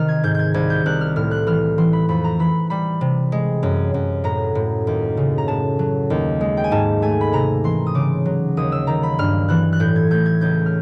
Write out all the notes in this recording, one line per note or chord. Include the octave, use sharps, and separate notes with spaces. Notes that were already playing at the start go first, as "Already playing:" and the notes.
Already playing: C3 D#3 F6
G#6
G#2 G6
G6 G#6
C2 G#6
G6
C2 F#6
F6
A2 F6
F#6
E3 F6
E3 C6
B5
F2 B5
A#5
E3 B5
G3 B5
C3
G#3
F#2
F#2
A2 A#5
A2
D#2
C#3
A#5
A2 A5
F#3
D#2
G#3
G5
G#5
G#2 A5
A3 G#5
B5
C3 A#5
E3 C6
D#6
C#3 D6
F#3
D#2 D#6
E6
D#3 A#5
B5
G2 F6
E3 F#6
F#6
A2 G6
G#6
A3 G6
G#6
C#2 G6
F6